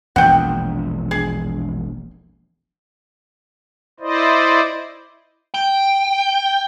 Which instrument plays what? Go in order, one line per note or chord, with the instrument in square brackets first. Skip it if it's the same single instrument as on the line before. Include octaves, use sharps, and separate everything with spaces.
[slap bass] E1 A#1 [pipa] F#5 G5
[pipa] G#4
[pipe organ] E4 C5 D5 D#5
[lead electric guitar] G5